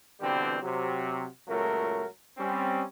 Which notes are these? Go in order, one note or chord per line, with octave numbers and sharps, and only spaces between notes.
B2 D3 E3 G3 C4 G4
C3 F#3
C#2 A#2 F#3 A3 A#4
G3 C4 C#4